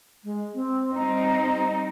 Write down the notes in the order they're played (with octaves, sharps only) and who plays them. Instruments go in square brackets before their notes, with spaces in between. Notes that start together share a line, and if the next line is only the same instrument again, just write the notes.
[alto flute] G#3
C4
[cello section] G3 C4 D#4 [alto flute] A#5